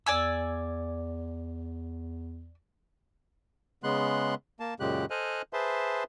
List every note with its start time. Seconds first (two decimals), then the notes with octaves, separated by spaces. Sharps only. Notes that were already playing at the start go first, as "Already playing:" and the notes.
0.06 E2 D5 G#5 E6
3.84 C#3 G#3 B3 C6 F#6
4.60 A#3 A5
4.80 F#2 A#2 C#3 G#3 G4 F#6
5.10 A4 C5 D#5 G#5 F6 F#6
5.53 G#4 B4 C5 E5 A5 C6